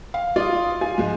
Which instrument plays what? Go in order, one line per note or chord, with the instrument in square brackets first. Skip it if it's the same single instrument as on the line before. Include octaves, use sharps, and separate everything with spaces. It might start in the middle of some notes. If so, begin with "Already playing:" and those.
[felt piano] F5
[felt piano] F4 [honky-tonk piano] D5 D#6
[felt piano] F4 [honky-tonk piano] G#5
[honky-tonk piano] G#2 F3 G#3